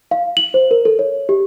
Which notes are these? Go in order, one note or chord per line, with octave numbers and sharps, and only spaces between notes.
F5
F#7
C5
A#4
A4
C#5
G4